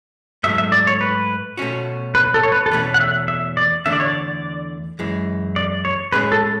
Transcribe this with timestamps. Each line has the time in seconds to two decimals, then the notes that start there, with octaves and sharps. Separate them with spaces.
0.44 G#2 F#3 A3 E5
0.58 E5
0.72 D5
0.87 C#5
1.01 B4
1.57 B2 A3 C#4 F#4
2.15 B4
2.34 A4
2.43 C#5
2.52 B4
2.66 A4
2.71 E2 B2 A3 C#4 B4
2.94 F#5
3.00 E5
3.28 E5
3.57 D5
3.86 E2 D3 A3 D4 E5
3.93 D5
4.00 C#5
4.07 D5
4.99 F#2 E3 G#3
5.56 D5
5.85 C#5
6.12 A2 G#3 C#4 G#4 B4
6.32 A4